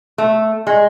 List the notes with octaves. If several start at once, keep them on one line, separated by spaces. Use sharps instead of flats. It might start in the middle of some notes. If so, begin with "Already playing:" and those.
A3
G#3